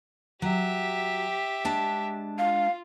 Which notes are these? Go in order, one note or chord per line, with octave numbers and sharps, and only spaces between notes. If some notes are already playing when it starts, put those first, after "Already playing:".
F#3 G4 E5
G#3 D4 A5
F4 F5